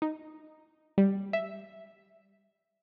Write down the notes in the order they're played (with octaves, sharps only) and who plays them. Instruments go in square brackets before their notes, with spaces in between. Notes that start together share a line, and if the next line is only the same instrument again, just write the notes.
[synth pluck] D#4
G3
E5